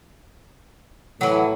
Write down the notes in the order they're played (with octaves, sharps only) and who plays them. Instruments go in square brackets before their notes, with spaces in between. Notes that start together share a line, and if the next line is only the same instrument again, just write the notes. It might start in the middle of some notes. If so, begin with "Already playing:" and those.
[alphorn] A2 [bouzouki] E3 F#3